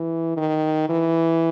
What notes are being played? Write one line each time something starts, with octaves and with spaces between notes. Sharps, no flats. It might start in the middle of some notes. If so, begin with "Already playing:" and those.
Already playing: E3
D#3
E3